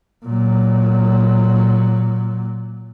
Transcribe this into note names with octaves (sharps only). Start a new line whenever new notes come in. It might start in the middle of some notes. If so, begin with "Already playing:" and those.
A#2 F#3